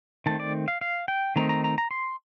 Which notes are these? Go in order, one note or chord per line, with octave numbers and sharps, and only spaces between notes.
D#3 A3 C4 A5
D5
F5
F5
G5
D#3 A3 C4 D#4 A#5
A#5
A#5
A#5
C6